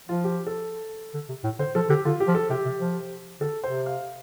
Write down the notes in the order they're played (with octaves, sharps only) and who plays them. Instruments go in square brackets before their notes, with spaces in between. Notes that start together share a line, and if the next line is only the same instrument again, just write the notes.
[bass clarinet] F3 [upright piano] F4
[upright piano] G4
A4
[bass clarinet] D3
C3
A2
[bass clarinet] D3 [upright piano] C5
[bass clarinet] F3 [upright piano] A4
[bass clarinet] D3 [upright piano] G4
[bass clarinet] D3 [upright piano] F4
[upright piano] G4
[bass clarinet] F3
[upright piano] A4
[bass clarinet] C3 [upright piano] G4
[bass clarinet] C3
F3
[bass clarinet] D3 [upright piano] A4
[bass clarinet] C3 [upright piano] C5
[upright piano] F5